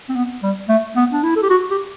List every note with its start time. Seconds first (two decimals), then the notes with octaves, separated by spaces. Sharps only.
0.09 C4
0.15 B3
0.43 G3
0.69 A3
0.96 B3
1.13 D4
1.23 E4
1.36 A4
1.43 G4
1.50 F#4
1.71 G4